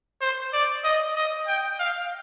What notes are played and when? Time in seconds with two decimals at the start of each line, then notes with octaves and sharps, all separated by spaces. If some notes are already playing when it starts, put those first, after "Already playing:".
0.21 C5
0.53 D5
0.85 D#5
1.16 D#5
1.47 G5
1.80 F5